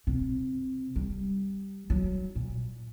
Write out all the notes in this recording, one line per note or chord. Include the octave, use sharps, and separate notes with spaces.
C3
G3
F#3
A#2